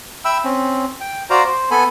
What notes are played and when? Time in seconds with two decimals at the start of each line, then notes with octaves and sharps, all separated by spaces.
0.25 E5 G5 B5 E6
0.44 C4 C#4
1.01 G5
1.30 F#4 C5 D5 F5 A#5
1.44 C5
1.71 B3 A4 G#5 B5